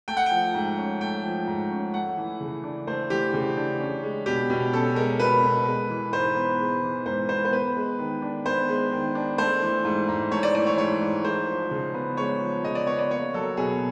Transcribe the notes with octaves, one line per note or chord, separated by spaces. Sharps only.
A3 G5
F#5
F3 G5
G#2
C#4
A3 G5
F3
G#2
C#4
A3 F#5
E3
C#3
D4
A3 C5
E3 G4
C#3
D4
C#4
G#3
B2 G4
B2
C#4 A4
G#3 A#4
B2 B4
B2
G#3
E3
G#2 C5
B3
G#3
E3
G#2 C5
B3 C5
C5
B3 B4
G#3
D#3
D4
B3 C5
G#3
D#3
D4
A3 C5
E3
G#2
G#2
A3 C#5
D5
E3 D5
C#5
G#2 C#5
G#2
G#3 C5
F3
C#3
B3
G#3 C#5
F3
C#3 D#5
D5
B3 C#5
D5
A#3 C#5
F#3 A4
B2 G#4